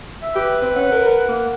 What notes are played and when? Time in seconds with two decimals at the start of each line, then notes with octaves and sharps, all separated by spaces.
0.22 E5
0.36 G4 B4
0.62 C4
0.76 C#4 F#5
0.92 A#4
1.29 A#3